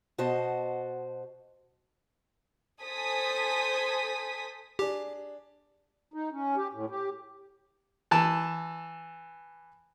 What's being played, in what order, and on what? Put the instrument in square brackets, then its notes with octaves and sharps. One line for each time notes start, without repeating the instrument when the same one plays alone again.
[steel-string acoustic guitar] B2 F#4 C5 D#5 A5
[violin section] A4 C5 G#5 D#6 B6
[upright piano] D4 G#4 [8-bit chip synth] G4
[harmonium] D#4
C#4
G4
A2
G4
[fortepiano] E3 A5